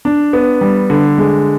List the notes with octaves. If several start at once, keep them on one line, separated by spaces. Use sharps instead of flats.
D4
B3
G3
D3
G#3